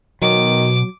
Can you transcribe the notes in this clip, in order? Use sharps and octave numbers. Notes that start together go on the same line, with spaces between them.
B2 D#3 F#3 D6